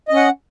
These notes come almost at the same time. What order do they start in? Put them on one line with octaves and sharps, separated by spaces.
D#5 C#4 F#5